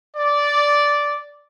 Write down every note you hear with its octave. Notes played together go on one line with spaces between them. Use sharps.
D5